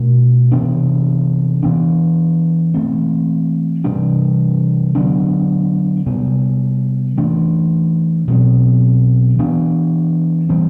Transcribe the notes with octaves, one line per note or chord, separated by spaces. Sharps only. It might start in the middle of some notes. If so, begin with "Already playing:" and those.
Already playing: B2 A3 D4
C3 E3 B3 D4
E3 B3 D4
E3 A3 C4
C3 E3 G3 D4
D3 F#3 B3 D4
C3 G3 B3
E3 A3 D4
B2 F#3 C4
E3 B3 D4
E3 G3 C4